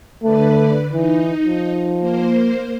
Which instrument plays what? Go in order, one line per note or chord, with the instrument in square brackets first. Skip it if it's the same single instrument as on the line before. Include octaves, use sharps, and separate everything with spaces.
[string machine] D3 B4 D5 [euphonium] A3
[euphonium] E3 [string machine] D#4
[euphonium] F3
[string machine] A#3 C5